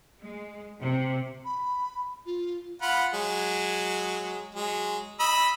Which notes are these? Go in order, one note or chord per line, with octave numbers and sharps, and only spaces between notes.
G#3
C3
B5
F4
F4 F#5 B5
F#3 G#3
F#3 G#3
D#5 B5 E6